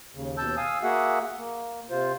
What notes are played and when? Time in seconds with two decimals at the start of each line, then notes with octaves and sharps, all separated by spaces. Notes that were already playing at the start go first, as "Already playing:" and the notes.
0.15 D#2 C#3
0.38 D#2 B2 A5 E6 G6
0.57 F5 G#5 D#6 E6
0.83 A#3 F#4 G#4 E5 F#5
1.38 A#3
1.90 C3 F4 C5